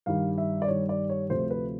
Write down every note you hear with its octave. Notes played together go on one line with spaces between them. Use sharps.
G2 D#3 G3 F5
E5
D5
G2 D#3 G3 C#5
D5
C#5
D2 C3 F3 A3 C5
B4